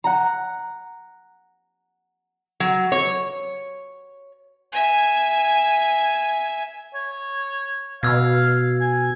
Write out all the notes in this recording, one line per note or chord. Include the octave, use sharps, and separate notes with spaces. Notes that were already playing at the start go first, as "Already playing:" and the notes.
F#5 A#5
F#3
C#5
E5 G#5
C#5
B2 F5 E6 G#6
G#5